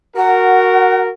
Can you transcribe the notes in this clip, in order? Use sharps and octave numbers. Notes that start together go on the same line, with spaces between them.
F#4 A#4 F#5